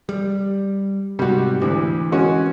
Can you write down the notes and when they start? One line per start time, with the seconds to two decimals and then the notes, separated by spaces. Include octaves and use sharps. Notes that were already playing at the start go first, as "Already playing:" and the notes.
0.09 G3
1.19 G#2 C3 G3 F#4
1.62 D2 E3
2.12 G#3 C#4 F#4